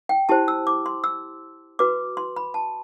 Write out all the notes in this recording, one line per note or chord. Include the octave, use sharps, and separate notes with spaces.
G5
E4 G4 C5 A5
E6
D6
C6
E6
F#4 B4 D6
C6
B5
A5